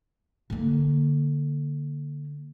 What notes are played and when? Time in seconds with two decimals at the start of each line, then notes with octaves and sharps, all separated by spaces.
0.50 D3 A#3